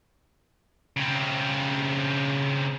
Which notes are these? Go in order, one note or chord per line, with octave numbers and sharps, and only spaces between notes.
C#3 C4